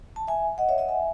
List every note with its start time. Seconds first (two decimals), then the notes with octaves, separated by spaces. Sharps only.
0.16 A5
0.28 E5 G#5
0.58 D#5 F#5
0.69 C#5 E5
0.78 D#5 F#5
0.88 E5 G#5